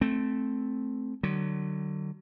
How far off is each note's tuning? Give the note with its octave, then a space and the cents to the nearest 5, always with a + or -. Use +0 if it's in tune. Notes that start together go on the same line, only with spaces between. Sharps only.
A3 -10 C4 +0
D3 +40 F#3 +35